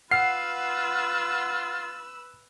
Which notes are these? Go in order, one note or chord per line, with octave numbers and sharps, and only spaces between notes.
F4 B4 F#5 E6 F6 C7